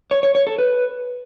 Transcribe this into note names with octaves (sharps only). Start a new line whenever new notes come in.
C#5
C#5
C#5
A4
B4